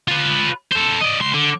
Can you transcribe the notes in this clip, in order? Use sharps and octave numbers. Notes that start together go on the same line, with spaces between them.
F4 B4
A4 C5
D5 D#5
C#2 C6
D3